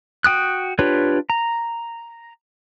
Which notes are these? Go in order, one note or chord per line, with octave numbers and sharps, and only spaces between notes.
F#4 G5 D#6 F#6
D4 F4 G4 B4 C#5
A#5